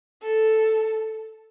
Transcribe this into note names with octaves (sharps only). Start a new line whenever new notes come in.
A4